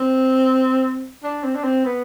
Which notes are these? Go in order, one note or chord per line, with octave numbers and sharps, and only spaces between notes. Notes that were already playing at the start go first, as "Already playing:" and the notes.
Already playing: C4
D4
C4
D4
C4
B3